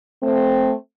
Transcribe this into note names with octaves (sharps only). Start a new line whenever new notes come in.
A3 C4